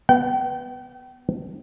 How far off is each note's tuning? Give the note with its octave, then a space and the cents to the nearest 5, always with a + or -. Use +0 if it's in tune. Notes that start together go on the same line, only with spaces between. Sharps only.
B3 +0 G5 -35